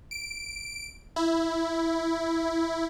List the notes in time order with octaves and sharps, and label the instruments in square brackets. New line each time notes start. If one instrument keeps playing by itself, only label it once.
[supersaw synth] D7
E4